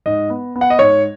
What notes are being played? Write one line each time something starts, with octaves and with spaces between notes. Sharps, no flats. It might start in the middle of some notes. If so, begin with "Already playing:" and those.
G#2 D#5
B3
B3
F#5
D#5
G#2 C#5